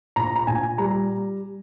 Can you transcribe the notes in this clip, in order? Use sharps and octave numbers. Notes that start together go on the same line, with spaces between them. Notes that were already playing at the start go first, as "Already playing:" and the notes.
A#2 A#5
A#5
A#2 G#5
G3 A#5